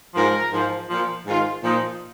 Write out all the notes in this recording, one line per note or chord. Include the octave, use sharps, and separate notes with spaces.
G#2 F3 A#4
G#2 F3
A#2 F3
G#2 D#3 F4
A#2 F3 D#4